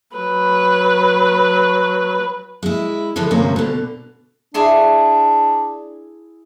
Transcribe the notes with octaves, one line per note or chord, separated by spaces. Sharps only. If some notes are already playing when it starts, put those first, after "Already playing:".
F#3 B4
G#3 E4
D3 E3 F3 G#3 A4
D2 G2 C3 A#3 C#4 C5
B2 D3
D4 E4 G#4 C6